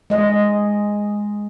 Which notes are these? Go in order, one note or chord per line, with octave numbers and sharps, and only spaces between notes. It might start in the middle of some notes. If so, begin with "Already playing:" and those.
G#3 D#5